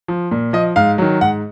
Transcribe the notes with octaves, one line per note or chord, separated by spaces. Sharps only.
F3
A#2
F3 D#5
G#2 F5
D#3 F#3
G#2 F#5